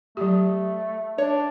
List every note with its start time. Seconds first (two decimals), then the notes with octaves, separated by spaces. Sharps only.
0.17 F#3 A3 G4
1.18 D4 C#5